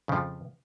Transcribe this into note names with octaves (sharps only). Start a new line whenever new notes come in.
F2 C#3 F3